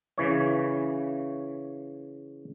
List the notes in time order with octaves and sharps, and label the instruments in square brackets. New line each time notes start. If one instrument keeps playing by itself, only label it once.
[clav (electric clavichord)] C#3 E3 C#5